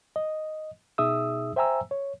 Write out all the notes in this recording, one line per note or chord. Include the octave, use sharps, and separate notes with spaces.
D#5
B2 D#4 G#4 E5 D#6 E6
C5 E5 G5 G#5 A#5 E6
C#5